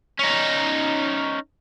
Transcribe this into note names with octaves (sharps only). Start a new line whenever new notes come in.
C#4 D#4